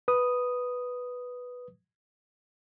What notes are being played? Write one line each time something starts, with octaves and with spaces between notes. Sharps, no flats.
B4 D#6